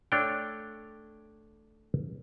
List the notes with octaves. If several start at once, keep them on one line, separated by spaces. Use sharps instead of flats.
A3 D4 C#5 D5 F5 G5